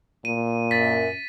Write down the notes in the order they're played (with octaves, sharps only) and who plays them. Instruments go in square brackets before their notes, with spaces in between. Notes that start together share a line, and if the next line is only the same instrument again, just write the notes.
[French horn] A#2 [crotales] D#7
[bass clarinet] F#2 [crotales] A6 B6